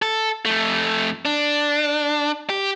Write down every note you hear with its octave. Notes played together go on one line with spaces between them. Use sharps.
A4
F2 A3
D4
G4